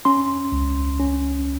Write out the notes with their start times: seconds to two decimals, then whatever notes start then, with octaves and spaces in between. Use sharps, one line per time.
0.05 C#4 C6
0.52 C#2
1.00 C#4